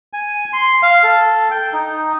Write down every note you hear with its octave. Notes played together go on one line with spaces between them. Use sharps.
G#5
C6
F5
A4
G5
D#4